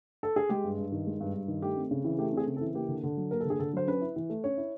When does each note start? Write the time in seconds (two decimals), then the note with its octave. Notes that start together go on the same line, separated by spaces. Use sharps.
0.23 A4
0.36 G#4
0.49 G#3 G4
0.64 G2
0.78 G2
0.92 D#3
1.06 G#3
1.21 G2
1.34 G2
1.48 D#3
1.62 A3 G4
1.77 C4
1.91 C#3
2.04 E3
2.19 A3 G4
2.33 C4 G#4
2.47 C#3
2.57 A4
2.61 E3
2.74 A#3 G4
2.88 D3
3.03 D3
3.17 F#3
3.31 A#3 A#4
3.40 A4
3.45 D3 G#4
3.59 D3 A4
3.73 F#3 C5
3.87 C#4 B4
4.01 E4
4.16 E3
4.30 A3
4.44 C#4 C#5
4.57 E4